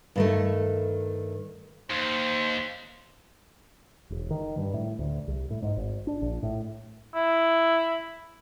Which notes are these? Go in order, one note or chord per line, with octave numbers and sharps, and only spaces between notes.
G2 D#3 A3
D#2 C5
E1
D#3
G2
A2
D2
C2
A2
G#2
G#1
D4
A#1
A2
E4